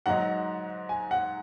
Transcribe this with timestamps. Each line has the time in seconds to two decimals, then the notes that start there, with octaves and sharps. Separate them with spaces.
0.06 G#2 F#3 D#4 F#5
0.89 G#5
1.11 F#5